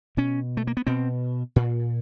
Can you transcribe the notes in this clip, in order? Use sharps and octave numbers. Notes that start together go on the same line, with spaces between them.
B2 C#4
A3
A#3
B3
B2 C4
A#2